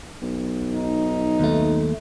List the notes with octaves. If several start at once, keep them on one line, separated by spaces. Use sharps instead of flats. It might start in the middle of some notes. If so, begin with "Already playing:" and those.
B1
D#4
D#2 A3